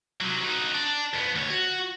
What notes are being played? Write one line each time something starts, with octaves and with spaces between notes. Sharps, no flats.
C3 F#3
D#4 F#4
D4
F2 B3
D2 C#5
F#4